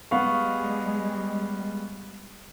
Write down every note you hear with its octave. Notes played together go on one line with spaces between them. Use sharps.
G3 G#3 B3 F5 C#6